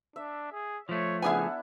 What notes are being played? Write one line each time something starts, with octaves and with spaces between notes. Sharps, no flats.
D4 E5
G#4
F3 A3 C#5
C#3 B3 D4 E4 G#4 F#5 G#5